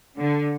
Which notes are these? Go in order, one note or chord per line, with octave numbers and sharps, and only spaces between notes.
D3